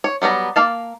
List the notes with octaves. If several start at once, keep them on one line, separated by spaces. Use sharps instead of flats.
C#5
F#3 G3 B3 A#5
A#3 F5 A5